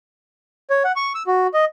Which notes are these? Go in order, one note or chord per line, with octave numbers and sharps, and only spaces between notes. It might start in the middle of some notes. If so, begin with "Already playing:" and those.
C#5
F#5
C#6
E6
F#4
D#5